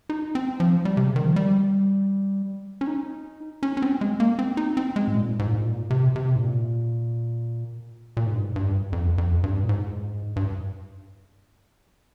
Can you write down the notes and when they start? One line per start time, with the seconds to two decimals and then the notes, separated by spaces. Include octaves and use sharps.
0.09 D#4
0.35 C4
0.60 F3
0.85 G3
0.97 C3
1.06 C#3
1.16 D#3
1.26 F3
1.36 G3
2.81 C#4
2.87 D#4
3.63 C#4
3.77 C#4
3.82 C4
4.01 G#3
4.20 A#3
4.39 C4
4.57 D#4
4.77 C4
4.96 G#3
5.08 G#2
5.15 A#2
5.39 G#2
5.48 A#2
5.55 G#2
5.65 A#2
5.90 C3
6.16 C3
6.36 G#2
6.41 A#2
8.17 A#2
8.26 G#2
8.34 G2
8.43 G#2
8.56 G2
8.93 F2
9.18 F2
9.43 G2
9.63 A#2
9.69 G#2
10.36 G2